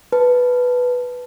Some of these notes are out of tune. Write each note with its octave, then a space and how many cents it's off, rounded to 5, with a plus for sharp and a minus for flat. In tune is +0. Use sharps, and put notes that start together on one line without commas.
B4 +0 A5 +0